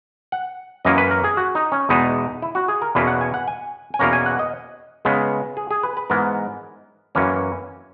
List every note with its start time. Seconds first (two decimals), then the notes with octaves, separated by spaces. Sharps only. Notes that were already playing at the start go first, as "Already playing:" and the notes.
0.32 F#5
0.85 F#2 E3 A#3 C#4 D#5
0.98 B4
1.11 A#4
1.24 G#4
1.37 F#4
1.55 D#4
1.72 C#4
1.89 E2 B2 G#3 B3 D#4
2.42 E4
2.55 F#4
2.68 G#4
2.82 A#4
2.95 E2 B2 A#3 C#4 B4
3.07 F#5
3.21 G#5
3.34 F#5
3.48 G#5
3.94 G#5
3.99 E2 B2 A#3 C#4 A#5
4.13 G#5
4.26 F#5
4.39 D#5
5.05 C#3 G#3 B3
5.57 G#4
5.71 G#4
5.83 B4
5.97 B4
6.10 G#2 E3 G#3 B3 A#4
7.15 F#2 E3 A#3 C#4